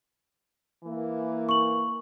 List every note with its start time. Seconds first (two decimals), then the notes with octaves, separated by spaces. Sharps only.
0.84 E3 A#3
1.49 C#6 F#7